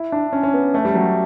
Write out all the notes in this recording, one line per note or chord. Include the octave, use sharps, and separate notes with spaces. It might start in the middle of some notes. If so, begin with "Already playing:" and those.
Already playing: E4
D4
C#4
C#4
B3
A3
G3
F#3